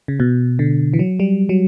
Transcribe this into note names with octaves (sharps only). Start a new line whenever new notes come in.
C#3
B2
D3
E3
F#3
G3
F#3